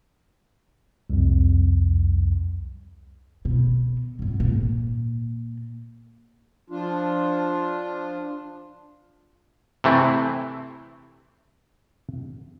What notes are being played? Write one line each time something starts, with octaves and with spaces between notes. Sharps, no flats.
C2 F2
B2
G#2 F#3
A#2
F3 D4 F4
C3 E3 A3 C4 E4